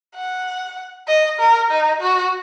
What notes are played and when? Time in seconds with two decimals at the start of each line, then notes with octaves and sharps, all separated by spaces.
0.15 F#5
1.07 D#5
1.39 A#4
1.70 D#4
2.00 F#4